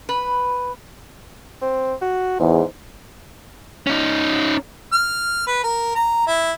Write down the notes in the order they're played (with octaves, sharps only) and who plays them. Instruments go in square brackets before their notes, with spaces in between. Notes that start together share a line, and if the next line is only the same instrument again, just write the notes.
[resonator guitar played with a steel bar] B4
[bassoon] C4
F#4
[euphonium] E2 [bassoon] G#2
[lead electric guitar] C#4 D#4
[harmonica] F6
B4
A#4
A#5
E4